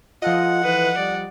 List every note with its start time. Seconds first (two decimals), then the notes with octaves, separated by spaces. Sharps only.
0.22 F3 F4 A4 D#5 F#5
0.64 E3 B4
0.98 G3 D5